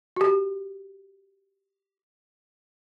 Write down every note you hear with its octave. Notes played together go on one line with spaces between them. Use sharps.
F#4 G4